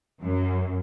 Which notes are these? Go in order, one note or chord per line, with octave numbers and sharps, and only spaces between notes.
F#2